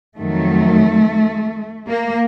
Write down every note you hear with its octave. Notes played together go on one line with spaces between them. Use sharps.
F2 D#3 F#3 A3
A#3